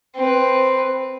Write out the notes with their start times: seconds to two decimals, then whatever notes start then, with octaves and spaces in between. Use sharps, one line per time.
0.15 C4 B4